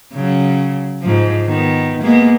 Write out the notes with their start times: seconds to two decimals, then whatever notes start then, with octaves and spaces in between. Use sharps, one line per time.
0.14 C#3 F#3
1.02 G#2 F3
1.46 D#3 B3
2.02 G#3 A#3 B3